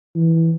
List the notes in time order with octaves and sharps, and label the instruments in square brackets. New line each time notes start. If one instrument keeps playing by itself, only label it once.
[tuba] E3